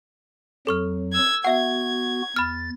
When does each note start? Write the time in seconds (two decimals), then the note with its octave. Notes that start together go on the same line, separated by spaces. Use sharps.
0.67 F2 F#3 A4 C#6 F6
1.13 E6 G#6
1.45 B3 F#4 E5 F#5 G#6
2.36 E2 B5 F6 A6